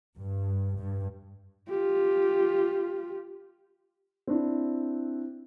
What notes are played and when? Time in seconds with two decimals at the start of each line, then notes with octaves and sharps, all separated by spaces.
0.19 G2
0.77 G2
1.68 F4 G4
4.27 C4 D4 E4